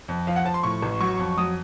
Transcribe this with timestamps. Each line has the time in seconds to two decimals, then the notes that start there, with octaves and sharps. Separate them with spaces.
0.08 F2
0.27 F3 F5
0.36 F#5
0.45 F3 A5
0.54 C6
0.63 A2 C#6
0.82 A1
1.00 F#3 C#6
1.19 F2
1.37 F#3 D#6